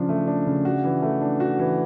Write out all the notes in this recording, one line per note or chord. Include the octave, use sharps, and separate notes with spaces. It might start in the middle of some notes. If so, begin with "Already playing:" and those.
Already playing: C#3 F3 D4
A3
D4
C#3
F#4
E3
A3
D4
F#4
E3